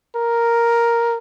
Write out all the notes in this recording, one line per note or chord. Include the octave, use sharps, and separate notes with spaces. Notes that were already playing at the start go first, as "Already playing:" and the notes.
A#4